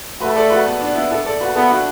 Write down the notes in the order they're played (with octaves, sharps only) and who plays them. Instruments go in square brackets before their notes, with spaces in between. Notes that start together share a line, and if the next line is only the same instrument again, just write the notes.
[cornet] A3 [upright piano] F#4 B4
[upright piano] A4 D5
F#4 B4
B3
D4
B3 E4
E4 A4
A4 D5
F#4 B4
[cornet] B3 [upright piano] E4 A4
[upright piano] D4 F#4